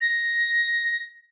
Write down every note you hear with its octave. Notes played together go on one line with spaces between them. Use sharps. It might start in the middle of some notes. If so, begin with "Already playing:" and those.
A#6